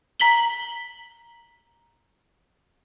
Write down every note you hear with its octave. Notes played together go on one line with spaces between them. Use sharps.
A#5 B6 F#7 G7